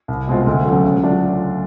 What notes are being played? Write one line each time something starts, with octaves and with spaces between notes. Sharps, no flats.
C2
B2 G#3 C4 F4
D2
C#3 F#3 A3
C#3
F#3 A3 D4 F4